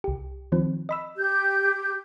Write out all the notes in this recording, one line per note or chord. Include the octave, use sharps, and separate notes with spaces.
C2 G4
D#3 F3 C4
D#5 B5 E6
G4 G6